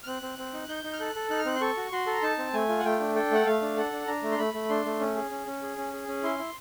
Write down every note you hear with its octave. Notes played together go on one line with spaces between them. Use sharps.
F6
C4 F#6
C4
C4
D#4
D#4 G6
D#4
F6
A4 F#6
A4
D#4 F#6
F6
C4 F#6
C6
A4 C#6
F#4
F#4 C6
A4 A#5
D#4 A5
C4
A3 G#5
F4
F#5
A3 G5
D4
A4 G5
A3 F#5
A3 F5
D4
A4 F#5
D4
D4 A#5
A3
C6
A3 B5
A3
D4 C6
A3
C#4
G#4
C#4
C#4
G#4
C#4
G#4
C#4
E4 C6
E4